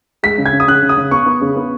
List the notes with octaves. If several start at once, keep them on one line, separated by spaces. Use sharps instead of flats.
G#3 B6
C#3
G#6
C#3
D#6
C#3 F#6
C#3
D#6
C#3
B3 C#6
B3
C#3
B3